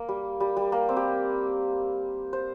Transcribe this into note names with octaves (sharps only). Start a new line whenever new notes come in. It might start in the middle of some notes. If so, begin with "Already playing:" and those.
Already playing: A#3
G3
G3
G3
A#3
C4
G4
C5